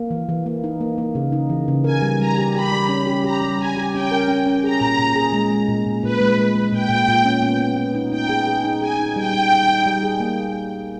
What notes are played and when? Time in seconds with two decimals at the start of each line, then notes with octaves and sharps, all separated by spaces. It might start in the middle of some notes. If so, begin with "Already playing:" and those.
Already playing: A#3
0.11 E3
0.29 E3
0.46 A#3
0.64 D#4
0.81 A#3
0.98 A#3
1.15 C#3
1.32 D#4
1.50 E3
1.68 C#3
1.84 A#4 G#5
2.02 G3
2.20 G3 A#5
2.38 G4
2.55 G4 B5
2.72 G3
2.89 C#4
3.07 G4
3.24 G4 A#5
3.42 G3
3.59 G4 G#5
3.77 G4
3.93 C#4 G5
4.11 A#4
4.28 C#4
4.46 C#4
4.63 G#4 A#5
4.81 A#2
4.99 A#2
5.16 G#4
5.33 G#3
5.51 G#3
5.68 A#2
5.86 A#2
6.03 A#2 B4
6.20 G#3
6.38 G#3
6.55 G#3
6.72 A#2 G5
6.90 A#2
7.08 A#2
7.25 C#4
7.42 B3
7.59 B3
7.77 B3
7.95 D#4
8.11 D#4 G5
8.29 G#4
8.47 G#4
8.64 D#4
8.81 G#4 G#5
8.99 D#4
9.16 G3 G5
9.34 D#4
9.51 D#4
9.68 D#4
9.86 G3
10.03 G#4
10.20 A#3